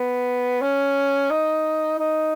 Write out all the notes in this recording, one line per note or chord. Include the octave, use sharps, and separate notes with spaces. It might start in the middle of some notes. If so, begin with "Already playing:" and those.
Already playing: B3
C#4
D#4
D#4